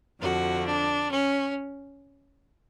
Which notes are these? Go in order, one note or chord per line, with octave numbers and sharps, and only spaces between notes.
F2 D3 F3 F#4
D4
C#4